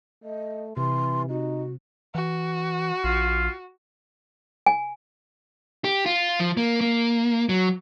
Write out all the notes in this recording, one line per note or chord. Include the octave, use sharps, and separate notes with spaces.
A3 D#5
C3 E3 C6
D#4 F#4
E3 F#4
A#1 F4
G#5
G4
F4
F3
A#3
A#3
F#3